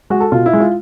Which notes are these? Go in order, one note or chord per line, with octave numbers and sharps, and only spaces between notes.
G#3 F#4
A4
B2 F4
E4
G#3
F4